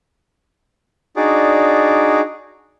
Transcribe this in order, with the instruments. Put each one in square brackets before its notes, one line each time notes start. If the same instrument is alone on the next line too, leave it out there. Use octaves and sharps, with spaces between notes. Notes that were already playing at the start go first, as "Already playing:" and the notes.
[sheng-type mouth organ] D4 D#4 F#4 G#4 D5